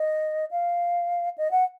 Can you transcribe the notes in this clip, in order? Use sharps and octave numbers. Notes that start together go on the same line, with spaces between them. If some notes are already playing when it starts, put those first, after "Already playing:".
Already playing: D#5
F5
D#5
F#5